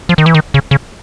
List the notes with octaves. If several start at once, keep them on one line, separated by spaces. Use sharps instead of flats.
F3
D#3
E3
D#3
C#3
C#3